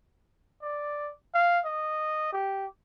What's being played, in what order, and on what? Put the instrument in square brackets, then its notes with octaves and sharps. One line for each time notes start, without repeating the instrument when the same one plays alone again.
[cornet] D5
F5
D#5
G4